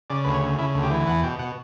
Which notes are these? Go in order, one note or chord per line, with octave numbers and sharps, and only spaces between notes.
C#3 D5
D2 B4
C#5
C#3
C#3 E4
D2
G4
E3
E2 F#5
B2 G5
B2 F#5